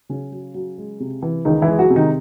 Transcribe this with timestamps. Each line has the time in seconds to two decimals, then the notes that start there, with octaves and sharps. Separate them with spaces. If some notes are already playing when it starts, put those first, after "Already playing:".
0.09 C#3 F#3 C#4
0.32 F#3
0.54 F#3
0.78 G#3
1.00 C3
1.22 E3
1.45 C#2 D#3 D#4
1.62 E3 E4
1.68 G#3
1.79 F#3 F#4
1.90 C3
1.96 D#3 D#4